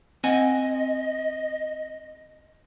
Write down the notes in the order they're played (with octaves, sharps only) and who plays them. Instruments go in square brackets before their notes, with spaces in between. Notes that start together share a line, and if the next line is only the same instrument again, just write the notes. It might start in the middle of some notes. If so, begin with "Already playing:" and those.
[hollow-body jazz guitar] C4 F#5 G#5 [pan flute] D#5